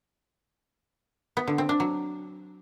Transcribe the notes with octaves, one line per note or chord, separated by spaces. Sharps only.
B3
D3
C4
D4
F#3